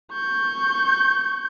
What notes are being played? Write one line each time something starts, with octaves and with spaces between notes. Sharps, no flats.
C#6 G6